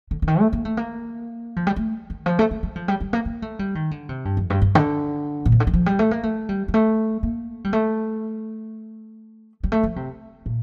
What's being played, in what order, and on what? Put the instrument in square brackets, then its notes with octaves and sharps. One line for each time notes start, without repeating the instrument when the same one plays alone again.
[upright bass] D3
D3
D#3
A3
A#3
A3
A#3
F3
G3
A3
D#3
F3
A3
A3
G3
F3
G3
G3
A#3
A#3
A3
G3
D#3
D3
C3
G2
F2
G2
G2
D3
A#2
C3
D3
D#3
F3
G3
A3
A#3
A3
G3
G3
A3
A#3
G3
A3
G3
A3
F3
C3
A#2